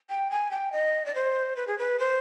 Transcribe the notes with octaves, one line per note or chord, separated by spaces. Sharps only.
G5
G#5
G5
D#5
D5
C5
B4
G#4
B4
C5